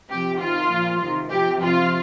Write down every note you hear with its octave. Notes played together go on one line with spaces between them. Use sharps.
C3 F3 G4
C3 D#3 F4
A#2 F3
C3 D#3
C3 F3 G4
C3 F3 F4